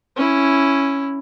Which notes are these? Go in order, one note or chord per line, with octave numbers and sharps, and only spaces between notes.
C#4 E4